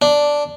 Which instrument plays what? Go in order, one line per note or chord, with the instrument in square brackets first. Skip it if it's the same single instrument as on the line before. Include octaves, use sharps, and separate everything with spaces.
[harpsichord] D4